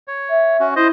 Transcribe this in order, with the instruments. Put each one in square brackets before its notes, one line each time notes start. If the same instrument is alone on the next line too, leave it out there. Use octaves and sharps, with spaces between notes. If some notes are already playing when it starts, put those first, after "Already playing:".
[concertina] C#5
[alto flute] E5
[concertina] C#4 F#4
[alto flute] E4 [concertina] C5 D#5